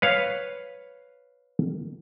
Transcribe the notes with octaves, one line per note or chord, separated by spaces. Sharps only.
B4 C#5 F5